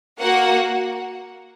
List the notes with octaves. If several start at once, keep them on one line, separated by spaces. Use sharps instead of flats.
A#3 F#4 F#5